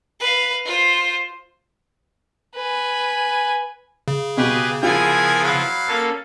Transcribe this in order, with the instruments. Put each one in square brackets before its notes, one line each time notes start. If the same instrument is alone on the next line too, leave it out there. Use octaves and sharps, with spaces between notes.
[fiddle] B4 F5
F4 C5
[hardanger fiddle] B4 G#5
[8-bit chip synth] C#3
[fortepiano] B2 [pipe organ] G4 B4 [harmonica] G#4
[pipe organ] F3 B3 E4 [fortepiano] F4 [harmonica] G#4 A#4 G#5
[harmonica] F#3 F5 B5
[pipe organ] A#3 C#4 A4